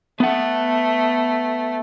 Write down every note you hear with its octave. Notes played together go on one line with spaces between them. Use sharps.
A3 B3 F#5